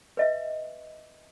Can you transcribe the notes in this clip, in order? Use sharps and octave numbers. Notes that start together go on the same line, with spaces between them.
B4 D#5 E5